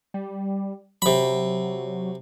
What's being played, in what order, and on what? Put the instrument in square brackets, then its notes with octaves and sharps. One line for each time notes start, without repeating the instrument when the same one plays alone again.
[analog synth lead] G3
[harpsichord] C3 B5 [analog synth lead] F#3